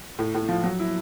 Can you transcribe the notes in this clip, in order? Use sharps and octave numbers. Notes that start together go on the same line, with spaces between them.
A2
A2
F3
F#3
E4